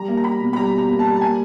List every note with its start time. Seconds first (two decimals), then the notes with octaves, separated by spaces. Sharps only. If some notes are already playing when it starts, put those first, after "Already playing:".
Already playing: G3 A#5
0.08 A#3
0.17 A#5
0.24 G3 B5
0.41 B2
0.53 B5
0.56 G3 A#5
0.73 B2
0.78 A#5
0.89 A#3
0.99 A5
1.05 G3
1.16 A5
1.21 A#3 G#5